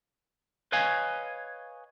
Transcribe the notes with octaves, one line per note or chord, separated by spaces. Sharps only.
B4 C#5 D#5 F5 G#5